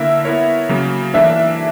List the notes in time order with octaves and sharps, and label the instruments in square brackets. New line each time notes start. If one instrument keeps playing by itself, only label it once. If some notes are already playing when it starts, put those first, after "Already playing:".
Already playing: [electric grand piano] D3 A#3 E4 A#4 [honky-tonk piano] E5
[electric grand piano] B3 E4 A#4 C#5
C#3 F#3 A#3
[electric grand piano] E3 A#3 D4 [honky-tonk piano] E5